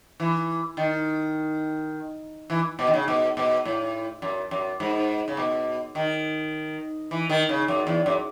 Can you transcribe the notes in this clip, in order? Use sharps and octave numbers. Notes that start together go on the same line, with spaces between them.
E3
D#3
E3
B2
D#3
C#3
B2
B2
A2
F#2
F#2
G#2
C#3
B2
D#3
E3
D#3
C#3
F#2
E2
F#2